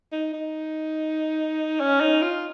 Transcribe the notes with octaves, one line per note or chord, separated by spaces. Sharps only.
D#4
D#4
C#4
D#4
F4